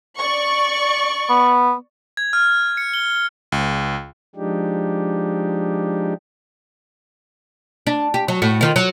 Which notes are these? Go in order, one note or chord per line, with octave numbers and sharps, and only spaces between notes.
D5 C#6
B3
G#6
F6
C#7
G7
C#2
F3 G#3 D4 D#4 G4
D4
G4
F#3
A2 F#4
D#3 F4
F#3